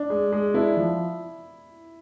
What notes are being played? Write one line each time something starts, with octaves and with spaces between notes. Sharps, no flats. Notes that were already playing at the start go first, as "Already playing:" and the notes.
Already playing: D4
G#3
G#3
D4 E4
F3